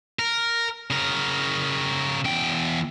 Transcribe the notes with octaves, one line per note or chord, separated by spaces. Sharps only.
A#4
C#3 A#4
E2 G5